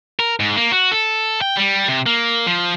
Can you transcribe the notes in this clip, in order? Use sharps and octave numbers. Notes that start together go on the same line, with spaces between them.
A#4
G#2
A#3
F#4
A4
G5
G3
C3
A#3
F3